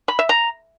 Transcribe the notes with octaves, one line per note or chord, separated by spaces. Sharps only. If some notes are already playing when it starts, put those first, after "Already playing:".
B5
E5
A#5